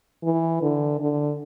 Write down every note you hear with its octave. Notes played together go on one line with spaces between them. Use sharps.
E3
D3
D3